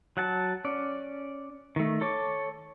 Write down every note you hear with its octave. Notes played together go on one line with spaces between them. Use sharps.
F#3 F#5 A5
C#4 D5
D#3 A3
A4 C#5 C#6 D6